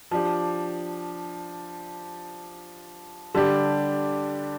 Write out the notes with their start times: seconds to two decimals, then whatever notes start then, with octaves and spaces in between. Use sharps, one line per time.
0.11 F3 D4 G4
3.34 D3 G3 D4 G4